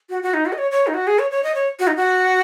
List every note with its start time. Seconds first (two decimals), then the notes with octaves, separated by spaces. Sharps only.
0.10 F#4
0.23 F#4
0.34 D#4
0.46 F#4
0.53 D#5
0.58 C#5
0.71 C#5
0.87 D#4
0.94 F#4
1.07 G#4
1.19 C#5
1.31 C#5
1.43 D#5
1.55 C#5
1.80 F#4
1.87 D#4
1.96 F#4